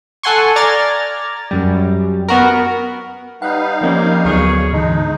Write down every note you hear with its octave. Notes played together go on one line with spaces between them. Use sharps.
A4 F#5 G#5 C6 C#6
D5 A#5 F6 G#6 A6
F#2 G3
B3 F#4 A#4
G3 D#4 B4 F5 F#5
F3 A#3 C4 C#4
D2 F#3 B3 G#4 C#5
G#2 D3 E3 G#3 D#4